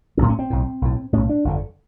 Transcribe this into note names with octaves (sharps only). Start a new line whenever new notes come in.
B1 A2 C#4
C#4
C4
B1 A2
B1 A2
B1 A2 C#4
D4
G1 F2 D3